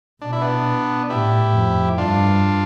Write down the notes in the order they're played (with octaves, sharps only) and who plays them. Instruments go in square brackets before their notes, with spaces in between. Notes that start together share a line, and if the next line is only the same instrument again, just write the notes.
[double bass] B2 [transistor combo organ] D4
[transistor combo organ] E4
B3 D4
[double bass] A2 [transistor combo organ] E4 G4
[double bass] F2
[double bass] G2 [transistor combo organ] D4 F4